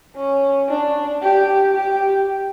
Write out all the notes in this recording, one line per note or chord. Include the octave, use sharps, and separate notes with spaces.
C#4
D4
G4
G4